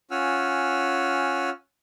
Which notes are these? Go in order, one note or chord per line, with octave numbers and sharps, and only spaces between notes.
C#4 F4 F#5 G#5 E6 F6